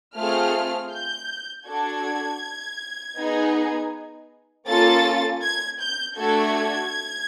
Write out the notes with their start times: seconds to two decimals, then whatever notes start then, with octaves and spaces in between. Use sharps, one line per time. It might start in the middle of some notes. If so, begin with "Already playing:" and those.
0.16 A3 C4 F4 G#4 F6
0.91 G6
1.66 D4 F#4 A4 G#6
3.17 B3 D#4 G#4
4.67 A#3 C#4 F4 A4 A6
5.42 G#6
5.80 G6
6.18 A3 D4 F#4 A4 G#6